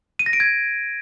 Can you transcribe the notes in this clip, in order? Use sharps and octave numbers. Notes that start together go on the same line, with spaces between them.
D#7
A#6
D7
G#6